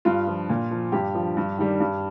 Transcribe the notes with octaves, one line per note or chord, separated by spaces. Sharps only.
G2 F4
F3
A#2
F3
G2 G4
F3
G2
D#3 G3
G2